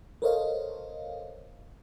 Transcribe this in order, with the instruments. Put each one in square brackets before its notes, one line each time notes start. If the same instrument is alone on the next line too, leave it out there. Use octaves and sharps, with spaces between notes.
[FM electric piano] A4 A#4 C5 C#5 D#5 F5